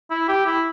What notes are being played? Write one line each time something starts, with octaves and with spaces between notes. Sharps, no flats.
E4
G4
E4